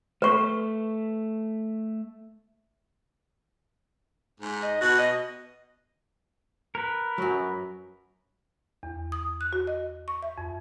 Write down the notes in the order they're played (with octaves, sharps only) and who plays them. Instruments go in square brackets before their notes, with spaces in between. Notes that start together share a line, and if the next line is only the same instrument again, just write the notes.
[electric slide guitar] A3 [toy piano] B4 C#6
[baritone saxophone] G#2
[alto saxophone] D#5
[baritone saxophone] B2 [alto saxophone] F#4
[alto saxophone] D#5
[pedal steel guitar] A#4 B4
[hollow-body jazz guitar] F#2 F#3
[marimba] E2
D#6
F#6
F#4
D#5
C#6
E5
F2